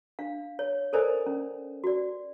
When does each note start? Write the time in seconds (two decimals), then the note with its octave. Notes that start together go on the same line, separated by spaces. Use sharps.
0.19 D4 F5
0.59 C#5
0.93 A4 A#4 C5 D5 D#5 G#5
1.26 C#4
1.84 F#4 D5